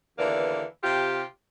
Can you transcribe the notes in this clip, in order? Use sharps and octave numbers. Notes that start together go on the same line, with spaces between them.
D#2 D3 E3 A#3 B3 D5
C3 F4 G4